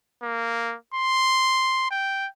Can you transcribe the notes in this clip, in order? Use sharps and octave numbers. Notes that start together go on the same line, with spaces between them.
A#3
C6
G5